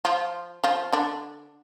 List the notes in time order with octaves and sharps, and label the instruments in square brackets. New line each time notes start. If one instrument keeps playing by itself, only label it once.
[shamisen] F3 F4
F3 F4
D3 D4